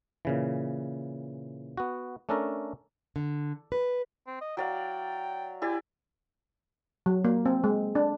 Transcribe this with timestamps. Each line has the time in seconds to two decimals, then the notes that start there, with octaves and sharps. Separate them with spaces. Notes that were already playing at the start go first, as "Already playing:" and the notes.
0.25 A#2 C#3 E3
1.77 B3 F#4
2.29 A3 C#4 D4 A4 A#4
3.16 D3
3.72 B4
4.27 C4
4.41 D#5
4.57 F#3 D5 F5 G5
5.62 E4 G4 D5 G#5
7.06 F#3
7.25 A#3
7.46 C4
7.64 G#3
7.95 D4